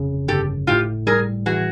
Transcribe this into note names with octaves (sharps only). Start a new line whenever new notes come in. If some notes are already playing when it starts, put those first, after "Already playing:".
Already playing: G1 F2 C#3
G1 G4 A4
A2 F4 G4
G3 G#4 A#4
E3 F#4 G#4